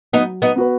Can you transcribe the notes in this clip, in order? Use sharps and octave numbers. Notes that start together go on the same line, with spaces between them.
F#3 B3 D#4
B3 D#4
B3 F#4 B4